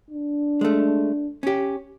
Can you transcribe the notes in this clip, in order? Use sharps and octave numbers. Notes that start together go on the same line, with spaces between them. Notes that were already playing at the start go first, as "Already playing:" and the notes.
D4
G#3 A3
C#4 G4